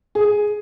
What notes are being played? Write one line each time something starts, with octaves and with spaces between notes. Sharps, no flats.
G#4